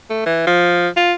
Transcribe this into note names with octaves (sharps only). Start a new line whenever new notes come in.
A3
E3
F3
F4